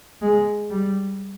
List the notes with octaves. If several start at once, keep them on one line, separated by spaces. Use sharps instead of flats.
G#3
G3